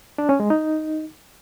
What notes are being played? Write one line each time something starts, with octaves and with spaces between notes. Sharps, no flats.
D4
C#4
G#3
D#4